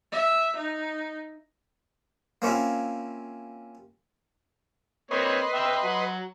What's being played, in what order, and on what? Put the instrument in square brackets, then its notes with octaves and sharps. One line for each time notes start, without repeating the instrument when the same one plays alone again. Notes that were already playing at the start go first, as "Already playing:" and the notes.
[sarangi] E5
D#4
[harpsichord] A#3 C4 C#4 E4 F4
[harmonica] A#3 C4 C#5 [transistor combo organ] B4 D#5 C6
[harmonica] E5 G5 E6
F#3 F#4